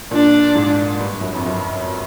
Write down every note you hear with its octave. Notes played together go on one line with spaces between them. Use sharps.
A#2 D4
G#2
G2
F#2
F2
F#2